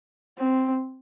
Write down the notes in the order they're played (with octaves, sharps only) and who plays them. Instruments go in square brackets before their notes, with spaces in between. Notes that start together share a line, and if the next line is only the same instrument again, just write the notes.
[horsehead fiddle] C4